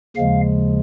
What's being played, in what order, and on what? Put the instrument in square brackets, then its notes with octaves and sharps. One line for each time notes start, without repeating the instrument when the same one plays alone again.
[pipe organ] D#2 C#3 F3 G#3 F5